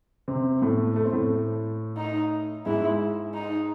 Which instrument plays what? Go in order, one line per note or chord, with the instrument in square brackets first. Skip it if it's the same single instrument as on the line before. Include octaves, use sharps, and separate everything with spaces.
[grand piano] C3 C4
A2 A3
A3
C4
A2 A3
[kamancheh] D#4
[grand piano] G#2 G#3 [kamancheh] E4
[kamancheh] D#4